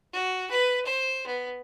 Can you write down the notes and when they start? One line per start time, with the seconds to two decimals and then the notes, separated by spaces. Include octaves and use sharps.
0.13 F#4
0.51 B4
0.86 C5
1.26 B3